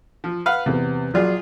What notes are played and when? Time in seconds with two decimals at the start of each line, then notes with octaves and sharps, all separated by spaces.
0.24 F3
0.46 B4 F5 F#5
0.66 E2 C3 B3
1.14 A#1 F#3 F4 G#4 D5